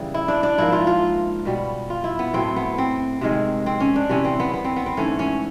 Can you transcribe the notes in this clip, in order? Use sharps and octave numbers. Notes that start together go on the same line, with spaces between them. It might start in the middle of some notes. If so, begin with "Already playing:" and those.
Already playing: C#3 E3 G3
E4
D4
D4
G#2 F3 A#3 E4
F4
F4
B2 G3 B3
F4
E4
B3
A2 F#3 A3 C4
B3
C4
C3 D#3 G#3
C4
C#4
D4
C3 E3 G3 C#4
C4
B3
B3
C4
B3
C4
G#2 E3 A3 C#4
C#4